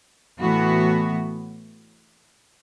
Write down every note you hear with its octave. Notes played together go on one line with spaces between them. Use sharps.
A2 E3 B3 F#4